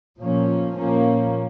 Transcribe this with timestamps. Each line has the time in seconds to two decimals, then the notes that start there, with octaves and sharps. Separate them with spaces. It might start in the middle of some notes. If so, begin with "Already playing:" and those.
0.19 A#2 F3 A#3 C#4
0.76 A#2 F3 A#3 C#4